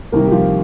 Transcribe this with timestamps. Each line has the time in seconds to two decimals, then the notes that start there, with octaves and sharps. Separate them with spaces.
0.12 C2 C3 D#3 A#3 A#4
0.24 G4
0.32 F3 F4